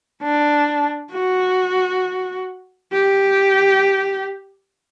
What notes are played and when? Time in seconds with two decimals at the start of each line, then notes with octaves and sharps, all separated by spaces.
0.23 D4
1.12 F#4
2.93 G4